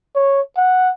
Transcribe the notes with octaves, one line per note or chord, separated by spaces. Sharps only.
C#5
F#5